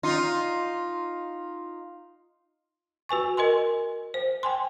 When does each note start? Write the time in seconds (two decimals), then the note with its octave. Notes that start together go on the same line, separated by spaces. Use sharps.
0.03 D#4 F4
3.09 F#4 B4 G#5 C#6
3.37 A#4 D#5 G#5 C6
4.14 C5
4.43 G5 G#5 C6